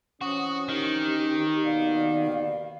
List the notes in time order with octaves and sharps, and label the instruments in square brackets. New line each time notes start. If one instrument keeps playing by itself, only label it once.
[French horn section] E3 C4 C#4 [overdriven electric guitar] F#4 [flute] D#6
[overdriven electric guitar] D#3 [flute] G4
[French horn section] D#2 B2 D5 [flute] F5